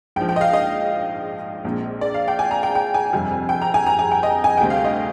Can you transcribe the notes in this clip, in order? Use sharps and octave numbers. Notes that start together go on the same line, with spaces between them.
A#1 G#2 F3 G5
G5
D#5
F5
D#5
A#1 A#2 G#3 C4
D5
F5
G5
G#5
A#5
G5
G5
G#5
G1 F2 C3 G3
G5
A#5
G#5
A#5
G#5
G5
D#5
G#5
D2 C3 G3 C4 G5
F5
D#5